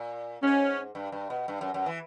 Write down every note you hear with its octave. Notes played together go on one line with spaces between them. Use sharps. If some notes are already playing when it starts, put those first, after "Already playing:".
Already playing: A#2
G#2 C#4
G2
G2
B2
G2
F#2
F#2
E3